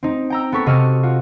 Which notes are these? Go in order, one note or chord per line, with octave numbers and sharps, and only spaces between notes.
C4 D#4
G5 A#5 E6
B3 A4 C#6 B6
C3 F#4 D#5 C#6 E6 F6
F4 F#4